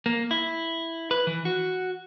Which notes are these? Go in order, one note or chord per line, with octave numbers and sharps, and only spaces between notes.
A#3
E4
B4
E3
F#4